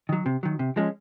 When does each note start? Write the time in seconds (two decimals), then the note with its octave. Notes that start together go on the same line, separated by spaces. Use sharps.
0.09 D#3 F#3
0.26 C3
0.43 D#3 F#3
0.59 C3
0.76 F3 G#3 C#4